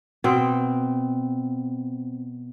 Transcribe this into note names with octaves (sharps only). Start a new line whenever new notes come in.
B2 C4 G5